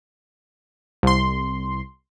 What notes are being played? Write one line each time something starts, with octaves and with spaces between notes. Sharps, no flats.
C2 C6